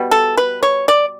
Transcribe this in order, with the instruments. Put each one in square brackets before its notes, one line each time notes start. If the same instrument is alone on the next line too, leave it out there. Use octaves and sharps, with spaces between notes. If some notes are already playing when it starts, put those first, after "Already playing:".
Already playing: [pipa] B2 G3 B3
A4
B4
C#5
D5